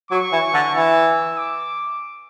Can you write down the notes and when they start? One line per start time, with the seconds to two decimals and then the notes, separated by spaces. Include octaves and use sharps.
0.11 F#3 C#6
0.32 E3
0.54 D3
0.75 E3 E6
1.38 D6